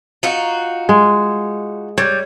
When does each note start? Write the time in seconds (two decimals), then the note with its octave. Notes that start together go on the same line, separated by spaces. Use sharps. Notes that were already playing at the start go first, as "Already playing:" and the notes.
0.23 D#4 F4 F#4
0.89 G#3
1.98 G3 C#5